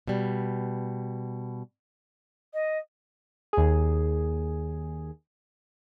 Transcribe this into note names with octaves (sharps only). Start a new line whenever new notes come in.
B2 G3
D#5
D#2 G#4